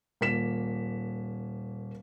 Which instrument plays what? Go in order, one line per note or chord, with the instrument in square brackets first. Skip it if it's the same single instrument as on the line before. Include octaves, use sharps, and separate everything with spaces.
[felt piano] D#1 A#3 B6 E7